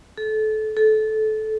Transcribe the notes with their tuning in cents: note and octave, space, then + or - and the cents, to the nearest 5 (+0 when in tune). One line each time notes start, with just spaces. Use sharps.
A4 -25
A4 -20